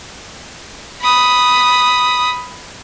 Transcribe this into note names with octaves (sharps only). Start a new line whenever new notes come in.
B5 D#6